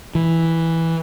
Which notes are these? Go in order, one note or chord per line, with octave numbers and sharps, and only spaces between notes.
E3